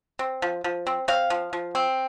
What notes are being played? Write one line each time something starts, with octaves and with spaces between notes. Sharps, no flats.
C4
F3
F3
C4
C4 F5
F3
F3
C4